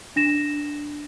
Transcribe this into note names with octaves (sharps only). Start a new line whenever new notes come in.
D4 A#6 E7